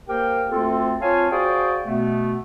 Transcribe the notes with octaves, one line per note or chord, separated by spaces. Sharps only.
A#3 G4 A#4 C5 G5
D2 C4 F4 A4
C4 F4 C#5 F5 G#5 A5
F#4 G#4 C5 D5 F5 G5
B2 A3 B3